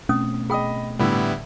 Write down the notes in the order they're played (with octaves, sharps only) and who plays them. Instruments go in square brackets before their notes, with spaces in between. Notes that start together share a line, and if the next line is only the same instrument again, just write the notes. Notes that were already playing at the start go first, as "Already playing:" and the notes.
[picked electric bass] B2 A3 C4 [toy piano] C#4 D#6
[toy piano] G#4 G5 D#6 [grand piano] D#5 B5
[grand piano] A2 D3 [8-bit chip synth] G3 B3 E4